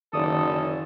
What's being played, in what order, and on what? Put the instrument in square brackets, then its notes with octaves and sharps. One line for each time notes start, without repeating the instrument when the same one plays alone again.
[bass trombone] F#1 [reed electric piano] D#3 D5 [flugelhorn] A4 [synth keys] D#6